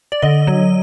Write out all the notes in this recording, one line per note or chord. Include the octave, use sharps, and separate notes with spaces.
D5
D3 D#5
F#3